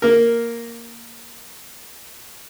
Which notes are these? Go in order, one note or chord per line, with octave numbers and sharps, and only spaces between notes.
A#3 A#4